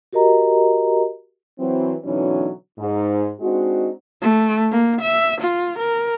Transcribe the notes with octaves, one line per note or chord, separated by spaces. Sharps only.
F#4 G4 A#4 D#5 A#5
E3 F#3 C4
B2 D3 E3 F#3 C#4 D#4
G#2
G#3 C4 D4 D#4 F#4
A3
A#3
E5
F4
A#4